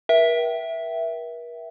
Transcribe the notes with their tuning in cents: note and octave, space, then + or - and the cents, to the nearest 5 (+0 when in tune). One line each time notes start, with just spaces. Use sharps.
A#4 +45 E5 +0 G5 -30